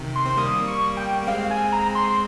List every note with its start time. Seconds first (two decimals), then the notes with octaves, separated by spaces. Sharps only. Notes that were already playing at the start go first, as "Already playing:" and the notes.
Already playing: C3 D#3
0.16 C6
0.26 C4
0.37 G3 A#3 D#6
0.68 C#6
0.97 G5
1.23 A#3
1.27 G#3 C4 F5
1.51 G#5
1.72 A#5
1.95 C6